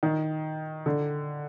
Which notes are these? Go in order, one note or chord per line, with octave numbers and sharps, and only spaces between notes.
D#3
D3